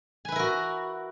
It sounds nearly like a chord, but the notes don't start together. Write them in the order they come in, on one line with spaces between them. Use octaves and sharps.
G#5 B4 E4 A#4 F#4